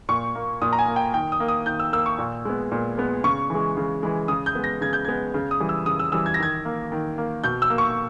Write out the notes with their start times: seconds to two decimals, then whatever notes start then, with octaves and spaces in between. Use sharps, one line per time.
0.09 A#2 C#6
0.35 A#3
0.62 A#2 D#6
0.73 A#5
0.79 G#5
0.88 A#3
0.96 G5
1.14 D#3 G5
1.32 D#6
1.40 A#3
1.48 D#6
1.66 D#3 G6
1.79 E6
1.93 A#3 E6
2.06 C#6
2.18 A#2
2.45 G#3 B3
2.72 A#2
2.98 G#3 B3
3.24 C#3 C#6
3.50 E3 G#3
3.77 C#3
4.03 E3 G#3
4.28 C#3 D#6
4.46 G6
4.55 G#3 B3
4.64 A#6
4.81 C#3 G#6
4.93 G6
5.05 G#3 B3 G#6
5.34 C#3
5.51 D#6
5.60 E3 G3
5.69 E6
5.86 C#3 D#6
5.99 E6
6.12 E3 G3 E6
6.26 G#6
6.34 A#6
6.39 D#3 G#6
6.65 A#3
6.92 D#3
7.18 A#3
7.44 B2 G6
7.62 E6
7.70 A#3
7.78 C#6